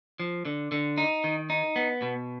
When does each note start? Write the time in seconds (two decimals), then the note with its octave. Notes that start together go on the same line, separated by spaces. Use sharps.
0.20 F3
0.45 D3
0.72 D3
0.98 D#4
1.24 D#3
1.50 D#4
1.76 B3
2.02 B2